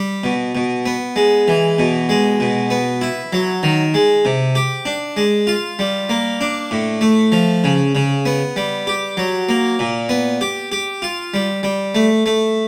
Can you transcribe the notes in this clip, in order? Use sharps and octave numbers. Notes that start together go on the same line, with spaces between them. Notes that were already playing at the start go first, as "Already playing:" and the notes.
Already playing: G3
B2
B2
B3
G#3
E3
B2
G#3
B2
B3
E4
F#3
D#3
G#3
C3
G4
D4
G#3
F4
G3
A#3
D4
A2
A3
F3
C#3
C#3
B3
G3
G4
F#3
A#3
A#2
B3
G4
G4
F4
G3
G3
A3
A3